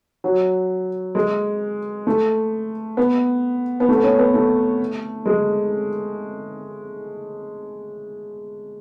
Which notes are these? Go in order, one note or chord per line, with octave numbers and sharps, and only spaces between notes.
F#3
G#3
A3
B3
B3
A3
B3
C#4
B3
A3
G#3